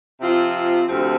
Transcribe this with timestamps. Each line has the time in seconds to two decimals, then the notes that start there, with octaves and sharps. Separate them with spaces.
0.20 C3 F3 C4 F4
0.86 D2 C3 F3 C4 F4